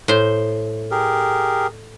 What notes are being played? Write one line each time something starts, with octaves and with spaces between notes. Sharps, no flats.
A2 C5
G4 G#4 A#4